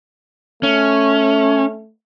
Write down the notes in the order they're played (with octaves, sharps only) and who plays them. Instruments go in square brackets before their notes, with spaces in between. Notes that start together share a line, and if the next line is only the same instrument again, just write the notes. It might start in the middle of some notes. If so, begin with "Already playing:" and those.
[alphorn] A3 [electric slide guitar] C#4